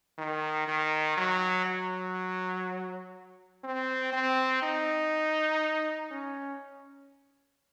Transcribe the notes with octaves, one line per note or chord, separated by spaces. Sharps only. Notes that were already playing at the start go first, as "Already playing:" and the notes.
D#3
D#3
F#3
F#3
C4
C4
D#4
C#4